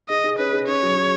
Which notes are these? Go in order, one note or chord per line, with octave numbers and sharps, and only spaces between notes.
G#4 D#5
G#4
C#4 B4
G#4
C#4 C#5
F#3
G#4